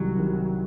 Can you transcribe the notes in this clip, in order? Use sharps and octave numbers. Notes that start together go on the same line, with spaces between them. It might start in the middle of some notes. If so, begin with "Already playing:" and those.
Already playing: C2 C3 D#3 F#3
C3 D#3